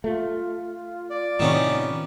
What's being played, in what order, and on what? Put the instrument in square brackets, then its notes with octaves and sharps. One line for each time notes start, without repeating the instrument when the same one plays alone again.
[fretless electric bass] A3 [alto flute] F4
[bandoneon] D5
[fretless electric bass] A2 C3 [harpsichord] D#3 B3 C#4